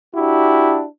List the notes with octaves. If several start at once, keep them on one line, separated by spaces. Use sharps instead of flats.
D4 E4 F#4 G4